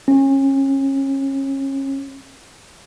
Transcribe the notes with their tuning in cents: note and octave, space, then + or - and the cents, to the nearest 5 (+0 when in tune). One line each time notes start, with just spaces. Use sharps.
C#4 -30